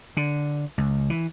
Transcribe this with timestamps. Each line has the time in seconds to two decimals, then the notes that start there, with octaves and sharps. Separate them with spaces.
0.17 D3
0.78 C#2
1.10 E3